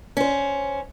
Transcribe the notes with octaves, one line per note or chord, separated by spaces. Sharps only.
C#4 C5